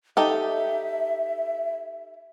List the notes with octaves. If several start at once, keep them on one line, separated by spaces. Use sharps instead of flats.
D#4 G4 A4 E5